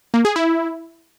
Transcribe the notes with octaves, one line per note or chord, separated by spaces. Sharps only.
A#3
G#4
E4